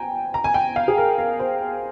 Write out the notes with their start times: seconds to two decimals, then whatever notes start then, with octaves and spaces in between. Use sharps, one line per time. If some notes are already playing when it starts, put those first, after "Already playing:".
Already playing: G5 G#5 A#5
0.34 A#5
0.44 G#5
0.54 G5
0.76 F5
0.88 G#4
0.98 A#4
1.18 A#4
1.40 C5